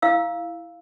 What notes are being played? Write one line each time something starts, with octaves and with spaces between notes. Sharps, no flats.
E4 F5 E6